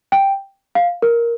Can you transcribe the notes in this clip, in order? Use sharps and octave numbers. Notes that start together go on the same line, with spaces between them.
G5
F5
A#4